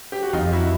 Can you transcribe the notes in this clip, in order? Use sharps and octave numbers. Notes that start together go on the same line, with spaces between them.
G4
F#4
F2 D#4 F4
E4 F#4